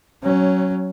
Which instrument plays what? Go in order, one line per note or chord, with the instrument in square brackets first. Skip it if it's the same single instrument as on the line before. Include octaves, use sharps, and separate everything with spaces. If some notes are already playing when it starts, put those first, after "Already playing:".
[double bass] F#3 C#4